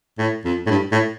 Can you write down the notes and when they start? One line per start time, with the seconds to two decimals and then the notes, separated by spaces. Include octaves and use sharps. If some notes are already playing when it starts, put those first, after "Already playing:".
0.19 A2
0.45 F2
0.67 A2
0.71 G2
0.92 A2